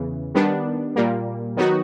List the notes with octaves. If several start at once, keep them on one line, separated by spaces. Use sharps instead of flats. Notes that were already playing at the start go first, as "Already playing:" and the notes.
Already playing: E2 C#3 E3
D#3 G3 B3 D4
A#2 G3 A#3
D#3 F#3 B3 D#4 F#4